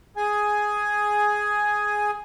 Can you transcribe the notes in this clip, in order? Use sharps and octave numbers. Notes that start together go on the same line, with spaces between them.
G#4 G#5